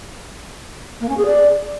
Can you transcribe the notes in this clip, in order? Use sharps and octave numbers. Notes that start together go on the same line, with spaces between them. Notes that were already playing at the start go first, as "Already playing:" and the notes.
A#3
C#4
G#4
D5